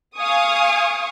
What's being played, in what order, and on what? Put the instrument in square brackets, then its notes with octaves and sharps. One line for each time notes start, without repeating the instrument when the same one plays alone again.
[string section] F5 G#5 C#6 D#6